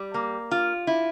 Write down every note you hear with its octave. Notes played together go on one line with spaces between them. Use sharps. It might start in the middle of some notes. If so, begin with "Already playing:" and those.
Already playing: G3
A#3
F4
E4